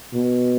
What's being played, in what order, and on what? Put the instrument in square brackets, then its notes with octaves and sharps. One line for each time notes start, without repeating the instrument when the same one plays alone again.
[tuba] B2